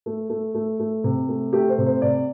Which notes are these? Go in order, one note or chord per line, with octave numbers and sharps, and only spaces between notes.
A3
A3
A3
A3
C3
A3
A3 G4
C5
C3
C5
C3 D5